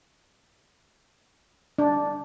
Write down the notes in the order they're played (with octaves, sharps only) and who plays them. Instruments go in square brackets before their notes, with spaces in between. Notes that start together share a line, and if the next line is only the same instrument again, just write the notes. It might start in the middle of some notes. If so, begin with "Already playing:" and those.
[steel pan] D4